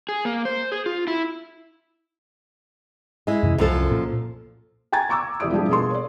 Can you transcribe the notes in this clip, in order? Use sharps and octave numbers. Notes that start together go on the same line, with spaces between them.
G#4
A#3
C5
G#4
F4
E4
G#3 E4
F#2 C3 E3
C2 F#2 F3 A4
C2
A#2
G5 G#5 A#5 G#6 A6
A#5 C#6 D6 E6 G#6
E1 E4 G4 D5 D#6 D7
F3 G3 D4 E4 G4 G#4
B2 A#3 G#4 A4 C6
C#5 D5